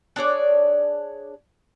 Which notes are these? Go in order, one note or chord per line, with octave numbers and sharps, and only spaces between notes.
D4 G#4 C#5 D5